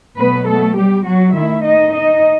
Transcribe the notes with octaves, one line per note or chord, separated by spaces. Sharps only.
B2 F#3 A3 B3 B4
A3 A4
G3 G4
F#3 F#4
D#3 A3 E4 E5
D#4 D#5
D#4 D#5